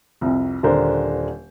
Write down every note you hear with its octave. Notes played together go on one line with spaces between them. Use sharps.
C2 F2
D#1 D3 D4 A#4 C5